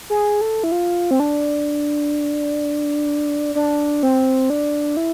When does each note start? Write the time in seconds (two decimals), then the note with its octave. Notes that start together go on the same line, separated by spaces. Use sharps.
0.10 G#4
0.41 A4
0.64 E4
0.72 F4
1.11 C4
1.20 D4
3.55 D4
4.03 C4
4.50 D4
4.97 E4